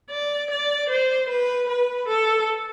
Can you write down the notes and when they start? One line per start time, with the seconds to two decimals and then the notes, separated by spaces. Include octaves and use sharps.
0.10 D5
0.50 D5
0.89 C5
1.29 B4
1.68 B4
2.08 A4